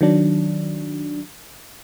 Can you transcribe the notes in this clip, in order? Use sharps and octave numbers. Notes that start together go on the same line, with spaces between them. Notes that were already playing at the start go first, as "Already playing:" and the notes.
D#3 F#3 D4